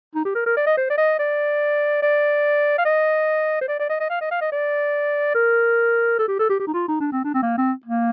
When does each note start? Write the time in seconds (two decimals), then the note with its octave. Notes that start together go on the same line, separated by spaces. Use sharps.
0.15 D#4
0.25 G4
0.35 A#4
0.46 A#4
0.56 D5
0.67 D#5
0.77 C5
0.90 D5
0.98 D#5
1.19 D5
2.02 D5
2.78 F5
2.85 D#5
3.61 C5
3.68 D5
3.79 D5
3.89 D#5
4.00 D#5
4.10 F5
4.21 D#5
4.31 F5
4.41 D#5
4.52 D5
5.35 A#4
6.19 A4
6.28 G4
6.39 A4
6.49 G4
6.60 G4
6.67 D#4
6.74 F4
6.88 D#4
7.00 D4
7.12 C4
7.24 D4
7.34 C4
7.43 A#3
7.57 C4
7.85 A#3